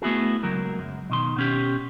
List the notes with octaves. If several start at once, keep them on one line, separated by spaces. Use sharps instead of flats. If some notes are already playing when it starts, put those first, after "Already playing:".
A3 B3 E4 F#4 G#4
C#2 F#3 A#4
F#2
B2 D#3 C6
B2 C#4 G4